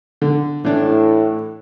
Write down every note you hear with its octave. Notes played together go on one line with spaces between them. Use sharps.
D3
A2 E3 D4